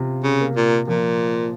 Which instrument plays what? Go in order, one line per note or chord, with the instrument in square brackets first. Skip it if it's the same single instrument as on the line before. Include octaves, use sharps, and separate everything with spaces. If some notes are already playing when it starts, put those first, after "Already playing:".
Already playing: [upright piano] C3 F4
[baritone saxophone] C#3
[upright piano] A#3
[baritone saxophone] A#2
[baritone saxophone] A#2 [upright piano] F3